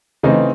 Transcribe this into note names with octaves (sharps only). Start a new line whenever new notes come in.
C#3 E3 A3 C4 D#4